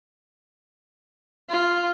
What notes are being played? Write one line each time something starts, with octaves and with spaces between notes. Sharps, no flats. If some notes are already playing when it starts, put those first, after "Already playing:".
F4